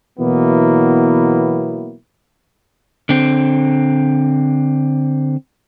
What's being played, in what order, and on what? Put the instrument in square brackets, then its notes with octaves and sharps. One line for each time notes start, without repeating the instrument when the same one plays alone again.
[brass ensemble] B2 E3 F#3 A#3 B3 E4
[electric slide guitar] D3 C4